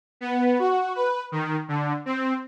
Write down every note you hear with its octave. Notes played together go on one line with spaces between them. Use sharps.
B3
F#4
B4
D#3
D3
C4